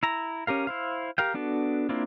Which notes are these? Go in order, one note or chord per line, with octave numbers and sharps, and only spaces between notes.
E4 A#5
C#4 G4 A#4 F5
E4 C5 F5
G4 A#4 F5 G5
B3 D4 F#4 A4
A#3 C4 D4 E4 F4